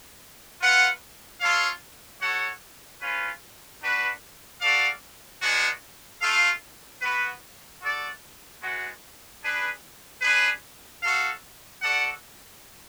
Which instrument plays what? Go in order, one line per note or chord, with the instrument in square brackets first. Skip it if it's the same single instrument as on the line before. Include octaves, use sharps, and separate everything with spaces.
[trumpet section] F4 B4 F#5
F4 A4 C#5 F5
F#4 A4 C#5 F#5
C#4 F4 B4
D4 F#4 B4
F#4 A4 D5 F5
G#3 B3 D4 F#4
A3 F4 A4 F5
B3 F#4 B4
F#4 A4 D5
G#3 B3 F#4
D4 G#4 B4
D4 G#4 B4
F#4 A4 F5
F#4 A4 D5 F#5